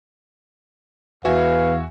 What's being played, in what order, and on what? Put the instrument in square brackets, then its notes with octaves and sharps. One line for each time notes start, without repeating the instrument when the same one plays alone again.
[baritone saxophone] E2 [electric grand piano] F#4 E5 G#5 [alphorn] B4 [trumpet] F5